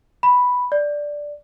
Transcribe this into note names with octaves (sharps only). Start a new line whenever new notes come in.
B5
D5